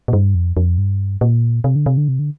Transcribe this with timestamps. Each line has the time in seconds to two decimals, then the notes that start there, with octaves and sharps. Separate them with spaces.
0.08 A#2
0.13 G2
0.35 F2
0.57 F2
0.78 G2
1.21 A#2
1.64 C3
1.76 D3
1.86 C3
1.97 D3
2.08 C3
2.19 D3